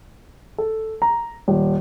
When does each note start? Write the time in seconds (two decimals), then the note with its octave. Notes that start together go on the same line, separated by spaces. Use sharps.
0.58 A4
1.02 A#5
1.48 D#1